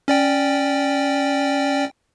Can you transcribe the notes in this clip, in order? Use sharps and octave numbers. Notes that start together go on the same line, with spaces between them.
C#4 D5 G5